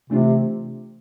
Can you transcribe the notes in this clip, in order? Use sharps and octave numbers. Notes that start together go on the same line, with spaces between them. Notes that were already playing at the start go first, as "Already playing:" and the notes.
C3 E3 A3 D4 F4